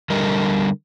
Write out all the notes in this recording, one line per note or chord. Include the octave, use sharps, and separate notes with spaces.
D3 G3 A#4 D#5